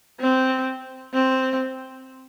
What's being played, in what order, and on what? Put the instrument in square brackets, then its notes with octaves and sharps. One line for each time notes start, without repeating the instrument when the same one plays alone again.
[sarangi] C4
C4